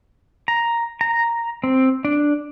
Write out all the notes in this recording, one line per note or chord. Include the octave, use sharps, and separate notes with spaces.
A#5
A#5
C4
D4